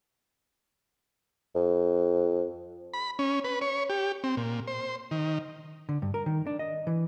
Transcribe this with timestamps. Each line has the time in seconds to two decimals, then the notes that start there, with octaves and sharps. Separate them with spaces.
1.55 F2
2.94 B5
3.19 C#4
3.44 B4
3.61 C#5
3.90 G4
4.24 C4
4.37 A#2
4.68 C5
5.11 D#3
5.89 D3
6.02 G2
6.14 A#4
6.26 D#3
6.47 D4
6.59 D#5
6.87 E3